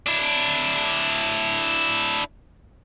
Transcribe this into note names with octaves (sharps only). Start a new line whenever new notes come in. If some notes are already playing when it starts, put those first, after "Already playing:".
D4 E4